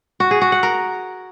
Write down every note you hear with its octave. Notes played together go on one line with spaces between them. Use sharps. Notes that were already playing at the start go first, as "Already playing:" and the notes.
F#4
G#4
F#4
F#5
A#4